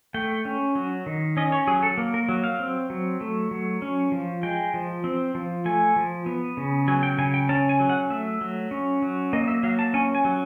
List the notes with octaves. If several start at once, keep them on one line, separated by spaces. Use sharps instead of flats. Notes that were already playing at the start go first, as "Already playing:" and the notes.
A3 G5
C#4
F#3
D#3
C#4 D#5
C#5
F#3 G#4
A4
A#3
A#4
F#3
F5
C4
F#3
A3
F#3
C#4
F3
G#3 G5
F3
C4
F3
A3 G#5
F3
B3
C#3
F#3 G#5
G5
C#3 G#5
G5
C#4 A5
G#5
F#3
F#5
A3 E5
F#3
C#4
F#3
A#3 D#5
D#5
E5
F#3 F5
A5
C#4 G#5
G#5
F#3